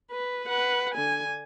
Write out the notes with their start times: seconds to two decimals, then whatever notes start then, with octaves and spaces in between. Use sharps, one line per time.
0.11 B4
0.48 B4 F#5
0.95 D3 G#5